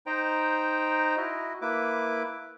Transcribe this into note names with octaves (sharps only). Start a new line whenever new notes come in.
D#4 C5 G5 A#5
E4 F#4 D#5
A#3 E4 B4 D6